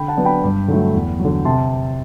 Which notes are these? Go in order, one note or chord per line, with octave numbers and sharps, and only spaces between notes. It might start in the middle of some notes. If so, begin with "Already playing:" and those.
Already playing: D3 G5 B5
F#5 A5
F#3 B3 D4
G5 B5
G2
D3 F#3 A3
E2
D3 F#3
C3 A5 C6